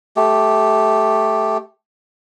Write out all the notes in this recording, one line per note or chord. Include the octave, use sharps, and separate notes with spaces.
A3 G4